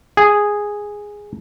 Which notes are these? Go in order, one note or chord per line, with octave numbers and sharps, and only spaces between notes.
G#4